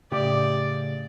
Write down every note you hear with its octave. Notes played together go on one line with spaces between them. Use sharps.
A2 C#3 G4 D5